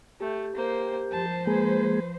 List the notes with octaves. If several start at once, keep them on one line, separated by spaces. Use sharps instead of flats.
A3 G4
A#3 C5
F3 C5 A5
G#3 A#3 G#4 B4